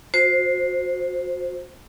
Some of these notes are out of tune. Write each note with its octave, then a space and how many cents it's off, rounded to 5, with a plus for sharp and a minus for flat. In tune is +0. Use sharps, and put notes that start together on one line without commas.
F#4 -35 C5 +0